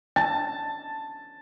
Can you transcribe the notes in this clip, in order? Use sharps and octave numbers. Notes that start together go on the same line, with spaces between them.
A5